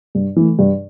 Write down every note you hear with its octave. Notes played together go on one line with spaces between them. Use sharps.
G2
E3 A3
G2